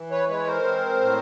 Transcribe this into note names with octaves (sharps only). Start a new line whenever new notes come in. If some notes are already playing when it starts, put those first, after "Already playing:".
Already playing: E3
B4 C#5
G#3 B4 C#5
A#4 C5
C4
A2